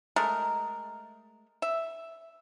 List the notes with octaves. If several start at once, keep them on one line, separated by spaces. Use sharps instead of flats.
G#3 A3 A#4
E5